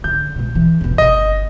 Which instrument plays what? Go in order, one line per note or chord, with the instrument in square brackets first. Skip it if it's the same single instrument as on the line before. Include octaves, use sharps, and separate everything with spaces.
[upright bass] D3 [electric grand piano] G6
[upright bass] B2 G#3
E3
E1 B2
[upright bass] G1 [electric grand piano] D#5